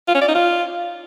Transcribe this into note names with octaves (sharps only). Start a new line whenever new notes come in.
F4
C#4
D5
D#4
F4